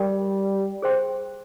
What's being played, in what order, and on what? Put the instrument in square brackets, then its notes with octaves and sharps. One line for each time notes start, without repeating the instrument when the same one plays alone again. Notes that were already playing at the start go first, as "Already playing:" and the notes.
Already playing: [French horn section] G3 [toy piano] G4 A#4 D5 G5
[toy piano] G#4 C5 G5 C6